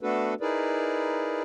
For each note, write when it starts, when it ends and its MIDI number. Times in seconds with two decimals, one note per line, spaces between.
0.01 0.34 57
0.01 0.34 59
0.01 0.34 62
0.01 0.34 66
0.01 0.34 69
0.01 0.34 71
0.41 1.43 63
0.41 1.43 64
0.41 1.43 68
0.41 1.43 70
0.41 1.43 71
0.41 1.43 74